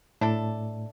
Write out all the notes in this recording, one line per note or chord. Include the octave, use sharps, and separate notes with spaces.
A2 D4 E4 A4